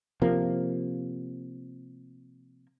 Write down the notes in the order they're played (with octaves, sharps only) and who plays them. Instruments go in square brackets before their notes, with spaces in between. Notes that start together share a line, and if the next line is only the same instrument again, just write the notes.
[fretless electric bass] C3 F3 A#3